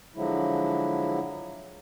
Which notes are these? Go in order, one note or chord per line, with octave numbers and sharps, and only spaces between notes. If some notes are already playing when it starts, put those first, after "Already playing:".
D3 F3 F#3 G#3 E4